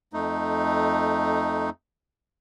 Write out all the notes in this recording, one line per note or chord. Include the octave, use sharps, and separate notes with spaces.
F2 A3 D#4